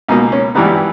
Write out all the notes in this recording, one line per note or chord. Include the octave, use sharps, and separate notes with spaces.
C#2 B2 A#3 D#4
C#4
G#1 G2 E3 G3 B3 D#4
G4